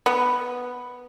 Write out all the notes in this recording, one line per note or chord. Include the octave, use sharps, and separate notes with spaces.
B3